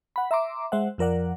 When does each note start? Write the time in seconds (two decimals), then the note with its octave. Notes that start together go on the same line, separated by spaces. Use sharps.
0.16 F#5 B5
0.31 E5 A#5 C6 D6
0.72 G#3 C5 E5 F#5
0.98 F2 F3 A#4 D5 F#5